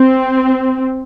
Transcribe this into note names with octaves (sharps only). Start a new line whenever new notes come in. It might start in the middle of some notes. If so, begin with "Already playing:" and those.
Already playing: C4